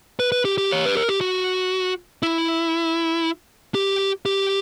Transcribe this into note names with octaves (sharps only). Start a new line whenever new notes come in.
B4
B4
G4
G4
C#5
B4
A#4
G4
F#4
E4
G4
G4